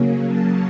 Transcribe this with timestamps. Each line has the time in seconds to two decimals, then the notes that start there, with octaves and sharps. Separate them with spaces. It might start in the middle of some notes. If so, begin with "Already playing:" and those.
Already playing: C#3 F#3 A#3 C#4
0.28 A5